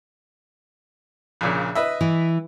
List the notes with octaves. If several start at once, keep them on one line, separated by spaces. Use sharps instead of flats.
A#1 A#2 C#3
B4 D#5 E5
E3